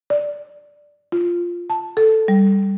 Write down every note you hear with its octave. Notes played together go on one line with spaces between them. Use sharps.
D5
F4
A5
A4
G3